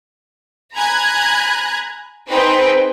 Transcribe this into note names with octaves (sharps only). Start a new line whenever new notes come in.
G#5 A#5 B5 F#6 G#6
C4 D#4 G#4 B4 G5